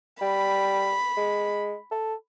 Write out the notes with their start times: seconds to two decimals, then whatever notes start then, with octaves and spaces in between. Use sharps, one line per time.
0.21 G3 B5
1.17 G#3
1.91 A4